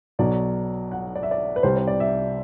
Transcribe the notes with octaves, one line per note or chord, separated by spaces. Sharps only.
B1 B2 F#3 D5
F#5
D5
E5
D5
B4
C2 C3 G3 C5
C5
D5
E5